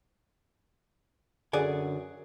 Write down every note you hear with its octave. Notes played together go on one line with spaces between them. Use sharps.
F#2 D3 G#4 D5 F#5 G#5